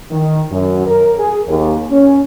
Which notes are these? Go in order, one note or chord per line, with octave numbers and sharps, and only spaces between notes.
D#3
F#2
A#4
G#4
D#2
C#4